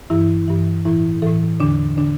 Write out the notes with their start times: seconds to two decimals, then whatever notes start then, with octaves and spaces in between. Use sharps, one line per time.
0.10 G2 E3 E4
0.48 G2 E3
0.85 A2 E3 E4
1.22 A2 E3 A4
1.60 E2 D3 D4
1.97 D3 D4